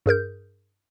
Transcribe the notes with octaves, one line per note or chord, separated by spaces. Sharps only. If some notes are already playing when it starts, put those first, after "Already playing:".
G2 G#4 A#4 G6